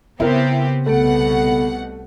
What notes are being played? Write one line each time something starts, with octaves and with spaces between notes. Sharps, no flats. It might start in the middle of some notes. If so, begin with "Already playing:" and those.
C#3 B3 C4 E4 G4 A#4
C2 B2 A3 B3 A4 F#5 B5